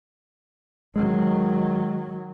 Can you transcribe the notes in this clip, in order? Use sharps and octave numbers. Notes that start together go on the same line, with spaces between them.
D#3 F#3 G#3